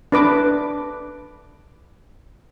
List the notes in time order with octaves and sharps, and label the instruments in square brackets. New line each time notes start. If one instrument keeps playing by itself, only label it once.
[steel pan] D4 B4 D6